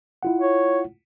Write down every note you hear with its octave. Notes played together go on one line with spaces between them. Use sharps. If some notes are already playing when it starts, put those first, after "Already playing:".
E4 F4 F#5
C#5